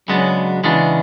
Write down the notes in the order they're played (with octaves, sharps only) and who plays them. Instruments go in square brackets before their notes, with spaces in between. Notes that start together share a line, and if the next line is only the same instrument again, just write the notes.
[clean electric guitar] C#3 G#3 B3 D4 [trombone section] F#3
[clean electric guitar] C#3 G#3 B3 D4 [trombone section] E3